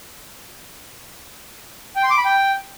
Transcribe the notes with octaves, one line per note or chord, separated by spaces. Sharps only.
G5
C6
D6
B5
G5